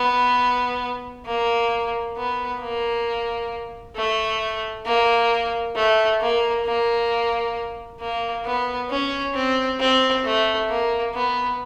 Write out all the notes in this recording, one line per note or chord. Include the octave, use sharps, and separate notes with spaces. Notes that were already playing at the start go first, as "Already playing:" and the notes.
Already playing: B3
A#3
B3
A#3
A3
A#3
A3
A#3
A#3
A#3
B3
C#4
C4
C4
A3
A#3
B3